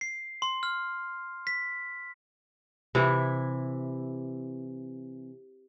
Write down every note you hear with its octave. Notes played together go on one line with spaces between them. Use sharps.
C7
C6
F6
B6
C3 E3 E4